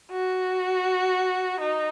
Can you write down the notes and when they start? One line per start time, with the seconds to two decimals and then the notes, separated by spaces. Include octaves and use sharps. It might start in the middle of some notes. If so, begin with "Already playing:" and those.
0.11 F#4
1.60 D#4